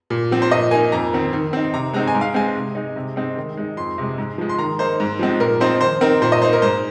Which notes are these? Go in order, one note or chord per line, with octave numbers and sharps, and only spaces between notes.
A#2
F3 C4
C5
A#2 D#5
A#3 D#4 G#5
F2 A#5
D#3 C4
D#3
C4 D#4
C3 A#5
G#3 C4 D#4 A#5
G#5
G#2
F5
G#3 C4 D#4 G#5
C3
G#3 D#4
C3
G#3 C4 D#4
D#3
G#3 D#4
F2 C6
C3 G#3
G#2
F3 G#3
C6
D#3 A#5
A#3 D#4 C5
G#2
F3 G#3 C4 D#4
A#2 A#4
F3 C4 D#4 C5
D#3 C5
C4 D#4 A#4
A#2 C5
D#5
A#3 D#4 C5
A#4
G#2 C5